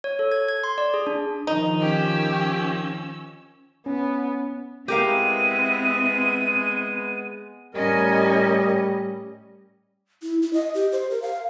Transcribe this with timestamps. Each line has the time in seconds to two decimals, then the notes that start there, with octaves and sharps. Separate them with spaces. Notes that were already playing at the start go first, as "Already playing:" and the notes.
0.04 C#5
0.19 A4
0.31 G#6
0.48 G#6
0.64 C6
0.78 D5
0.94 G#4
1.07 D4
1.47 D#3 F3 D#4
1.81 C#4 G4 E6
3.86 B3 C#4
4.88 G#3 B3 C4 E4 G4 A#4 F5 D#7
7.75 A2 G3 C#4 A#4 D#5 G#5
10.23 E4
10.42 E4
10.53 D#5
10.74 G4
10.92 C5
11.10 A#4
11.22 F5